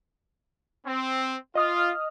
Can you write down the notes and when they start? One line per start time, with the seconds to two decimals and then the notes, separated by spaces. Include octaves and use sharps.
0.86 C4
1.55 F4 D#5 D#6 F6